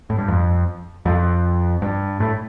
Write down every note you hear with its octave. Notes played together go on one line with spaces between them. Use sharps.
A2
G2
F2
F2
G2
A2